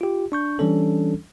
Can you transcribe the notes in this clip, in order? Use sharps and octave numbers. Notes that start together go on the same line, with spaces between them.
F4 G4
D4 C#6 G6
E3 G3 C#4 D4 A4